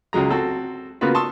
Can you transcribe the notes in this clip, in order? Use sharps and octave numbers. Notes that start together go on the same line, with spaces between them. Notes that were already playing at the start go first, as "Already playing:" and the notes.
C#2 C#3 F#3 G#3 A#5
C4 F#4 A4
C#3 A#3 B3 F4 F#4 B4
A5 C6 C#6 D#6 E6